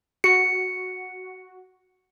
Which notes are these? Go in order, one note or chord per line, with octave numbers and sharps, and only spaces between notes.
F#4 C#7